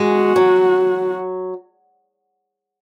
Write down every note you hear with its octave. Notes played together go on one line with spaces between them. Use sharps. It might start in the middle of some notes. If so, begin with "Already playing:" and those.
Already playing: G#3 F#4
F#3